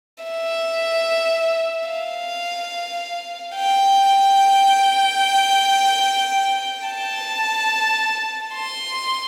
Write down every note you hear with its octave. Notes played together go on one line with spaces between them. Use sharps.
E5
F5
G5
A5
C6